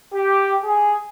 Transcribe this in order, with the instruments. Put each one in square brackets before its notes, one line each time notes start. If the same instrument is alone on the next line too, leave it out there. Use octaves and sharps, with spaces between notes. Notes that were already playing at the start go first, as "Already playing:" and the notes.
[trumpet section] G4
G#4